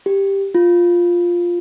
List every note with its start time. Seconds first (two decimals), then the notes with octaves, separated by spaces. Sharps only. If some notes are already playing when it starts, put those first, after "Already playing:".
0.06 G4
0.55 F4